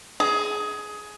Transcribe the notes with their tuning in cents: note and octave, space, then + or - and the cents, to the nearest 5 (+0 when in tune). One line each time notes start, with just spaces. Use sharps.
G#4 +15